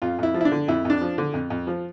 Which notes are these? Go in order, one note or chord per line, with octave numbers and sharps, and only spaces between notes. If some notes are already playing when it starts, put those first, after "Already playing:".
F2 F4
F2 E4
F3
E4
D4
D3
F2 E4
F2 D4
F3
D3
F2
F2
F3